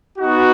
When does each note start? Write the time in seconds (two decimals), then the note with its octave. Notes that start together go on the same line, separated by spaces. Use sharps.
0.19 B3 D#4 F#4